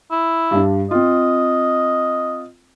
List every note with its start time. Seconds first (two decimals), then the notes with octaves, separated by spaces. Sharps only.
0.11 E4
0.51 G2 D4
0.91 C4 F4 D#5